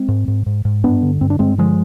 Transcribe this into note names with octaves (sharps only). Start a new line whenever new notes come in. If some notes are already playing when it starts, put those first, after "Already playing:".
Already playing: G#3 C4
G#2
G#2
G#2
G#2
G2 B3 D4
D3
G2 C4
D4
G2 G#3 C4
D3 F3 G#3